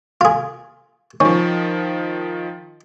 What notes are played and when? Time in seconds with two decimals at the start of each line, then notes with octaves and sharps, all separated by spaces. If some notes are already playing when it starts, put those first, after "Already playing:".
0.21 F4 G#4
1.20 D#3 F3 C#4